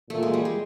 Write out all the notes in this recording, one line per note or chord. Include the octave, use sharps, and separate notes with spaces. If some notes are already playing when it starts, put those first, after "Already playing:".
A#2 A3
G#3
G3
G#3